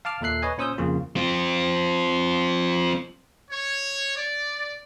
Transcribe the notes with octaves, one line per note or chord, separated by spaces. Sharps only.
F5 A5 D6 F6
D#2 A#2 A4 E5 F#6 C7
B4 C#5 D#5 G#5
A#2 C#4 C5 D#6 E6 G6
F2 C#3 F3 A#3 F4
C4 F4
C#5
D5